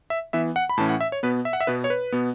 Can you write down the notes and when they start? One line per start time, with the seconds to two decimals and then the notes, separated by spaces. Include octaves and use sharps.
0.10 E5
0.33 E3 B3 E5
0.56 F#5
0.69 B5
0.78 A2 E3 C#4 A5
0.89 F#5
1.01 E5
1.12 C#5
1.23 B2 B3 B4
1.45 E5
1.53 F#5
1.60 E5
1.67 B2 B3 B4
1.84 C#5
1.90 B4
2.12 B2 B3